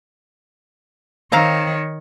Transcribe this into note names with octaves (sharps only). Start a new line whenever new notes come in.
D#3 C4 C#5 F5 A#5